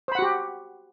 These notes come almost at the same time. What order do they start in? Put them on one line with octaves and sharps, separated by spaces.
C5 B5 F#5 F#4 G4